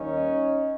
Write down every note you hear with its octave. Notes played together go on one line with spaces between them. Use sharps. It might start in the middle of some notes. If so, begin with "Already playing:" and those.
Already playing: D#2 D#3 G3 A#3 C#4 D#4